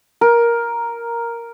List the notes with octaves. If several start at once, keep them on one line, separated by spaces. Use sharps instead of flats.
A#4